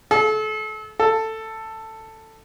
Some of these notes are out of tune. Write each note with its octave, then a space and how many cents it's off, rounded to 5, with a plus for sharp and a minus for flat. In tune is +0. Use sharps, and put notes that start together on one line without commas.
A4 -35
A4 +10